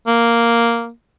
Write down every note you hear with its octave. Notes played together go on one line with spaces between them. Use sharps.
A#3